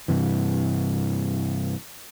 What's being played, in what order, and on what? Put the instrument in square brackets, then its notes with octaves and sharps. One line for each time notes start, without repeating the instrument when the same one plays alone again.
[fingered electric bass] G2 C3 E3